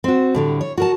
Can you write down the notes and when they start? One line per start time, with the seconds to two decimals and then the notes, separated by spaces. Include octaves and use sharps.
0.04 C4 F#4
0.35 A2 D3 G3
0.61 C#5
0.78 F#4 A#4 A5